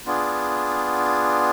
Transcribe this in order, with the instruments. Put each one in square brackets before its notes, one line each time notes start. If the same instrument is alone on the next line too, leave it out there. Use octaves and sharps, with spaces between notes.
[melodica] B3 D4 F4 G#4